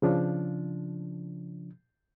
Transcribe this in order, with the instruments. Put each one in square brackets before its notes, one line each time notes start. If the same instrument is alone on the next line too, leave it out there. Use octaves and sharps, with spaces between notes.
[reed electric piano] C#3 F3 D4